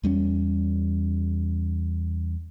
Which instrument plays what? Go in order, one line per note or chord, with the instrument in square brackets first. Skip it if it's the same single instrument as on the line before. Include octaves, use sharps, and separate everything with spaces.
[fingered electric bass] E2 G3 C4 C#4